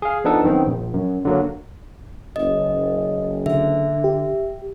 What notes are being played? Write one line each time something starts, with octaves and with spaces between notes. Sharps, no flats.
G#4 F5
F3 B3 D4 D#4 A4
F#2 D#3 B3 C4
A#1
F#2
D3 F#3 A#3
F#1 D#5
D3 E5
G4